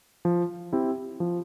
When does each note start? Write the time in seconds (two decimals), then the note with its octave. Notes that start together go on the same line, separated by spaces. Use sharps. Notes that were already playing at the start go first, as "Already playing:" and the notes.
0.25 F3
0.73 C4 E4 G4
1.20 F3